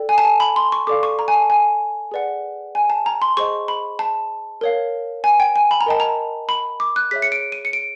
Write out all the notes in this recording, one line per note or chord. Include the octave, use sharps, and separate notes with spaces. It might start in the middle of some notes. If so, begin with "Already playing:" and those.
Already playing: A4 D5 G5
G#5
A5
G#5
B5
C6
C#6
A4 D5 F5 D6
C#6
A#5
G#5
A5
G#5
G#4 B4 D5 F#5
G#5
A5
A#5
C6
G#4 C5 D#5 C#6
B5
A5
A#4 C#5 F5
G#5
G5
G#5
B5
A#5
A#4 D#5 G5 A5
A#5
B5
D6
F#6
G#4 C#5 E5 B6
C#7
D7
D#7
C#7
D7